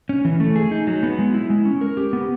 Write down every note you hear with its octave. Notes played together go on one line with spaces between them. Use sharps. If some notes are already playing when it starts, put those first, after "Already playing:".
C#4
E3
A3
G#4
D#4
F#3
B3
G#3
E4
G#3
C#4
A#4
G4
B3